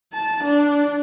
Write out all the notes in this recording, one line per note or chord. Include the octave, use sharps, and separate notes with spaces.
A5
D4